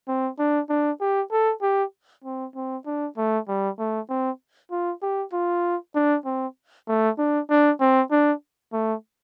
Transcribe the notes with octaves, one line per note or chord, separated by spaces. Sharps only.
C4
D4
D4
G4
A4
G4
C4
C4
D4
A3
G3
A3
C4
F4
G4
F4
D4
C4
A3
D4
D4
C4
D4
A3